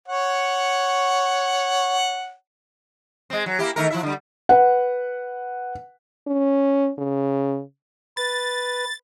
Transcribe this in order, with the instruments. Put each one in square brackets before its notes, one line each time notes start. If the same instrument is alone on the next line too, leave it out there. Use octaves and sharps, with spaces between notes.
[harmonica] C#5 F#5
[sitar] G#3 C4
F#3
A#3 E4 G4
D#3 A3 A#4
F3 E4 E5
D3 G3
[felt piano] B4 F#5
[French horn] C#4
C#3
[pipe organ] B4 [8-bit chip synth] A6